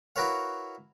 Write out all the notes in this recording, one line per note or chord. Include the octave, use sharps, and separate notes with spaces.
E4 F#4 A#4 B4 C#5 F5